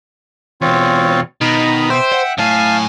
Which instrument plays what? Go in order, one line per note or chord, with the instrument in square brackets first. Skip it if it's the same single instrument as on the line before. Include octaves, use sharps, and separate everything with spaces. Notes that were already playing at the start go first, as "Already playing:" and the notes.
[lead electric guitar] E2 B2 [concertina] C4 F4 C#5
[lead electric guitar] B2 [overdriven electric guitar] D#3 [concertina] D#5 A#5 B5
[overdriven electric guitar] C5 [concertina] E5 G5
[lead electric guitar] F#5
[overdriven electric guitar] F#2 G#5 [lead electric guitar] A2 [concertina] F5 A5